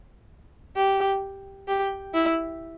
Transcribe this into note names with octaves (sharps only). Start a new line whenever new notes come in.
G4
G4
E4